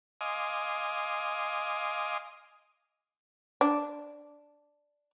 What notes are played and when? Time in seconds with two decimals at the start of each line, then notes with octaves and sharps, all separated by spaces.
0.21 D#5 F5 G#5 C6 D6 D#6
3.61 D4